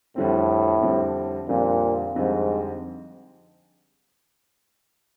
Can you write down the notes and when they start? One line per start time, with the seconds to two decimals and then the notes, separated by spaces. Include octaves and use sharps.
0.16 F2 A2 D3 G3 C4
0.82 F2 D3 G3 C4
1.49 F2 A#2 D3 G3 C4
2.15 F2 G#2 D3 G3 C4